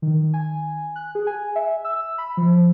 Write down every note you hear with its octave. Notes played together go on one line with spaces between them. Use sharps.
D#3
G#5
F#6
G#4
G#5
E5
E6
B5
F3